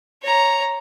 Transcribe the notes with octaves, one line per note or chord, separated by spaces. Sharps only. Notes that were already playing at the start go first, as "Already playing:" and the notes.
C#5 A#5